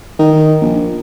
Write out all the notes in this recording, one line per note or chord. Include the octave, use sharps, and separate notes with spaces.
D#3
A#1